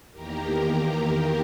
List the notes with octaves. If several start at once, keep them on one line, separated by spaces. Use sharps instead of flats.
E2 D#3 A#3 G4 A#4
G4 A#4